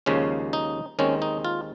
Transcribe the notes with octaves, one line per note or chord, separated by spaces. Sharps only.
D#2 C#3 F3 G#3 C#4
D#4
D#2 D#3 G#3 C4 C#4
D#4
F4